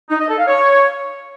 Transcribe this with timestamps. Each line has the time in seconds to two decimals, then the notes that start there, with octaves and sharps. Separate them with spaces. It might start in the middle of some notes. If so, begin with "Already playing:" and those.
0.10 D#4
0.19 D#5
0.28 A4
0.38 F5
0.47 C#5